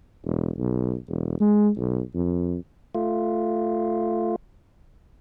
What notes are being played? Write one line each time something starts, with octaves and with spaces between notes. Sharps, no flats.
E1
B1
E1
G#3
B1
F2
A3 F4